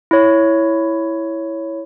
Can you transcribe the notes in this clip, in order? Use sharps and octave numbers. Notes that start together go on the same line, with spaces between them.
E4 C#5